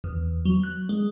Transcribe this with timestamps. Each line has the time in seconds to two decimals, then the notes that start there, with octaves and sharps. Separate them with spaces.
0.04 E2
0.45 F#3
0.63 F#6
0.89 G#3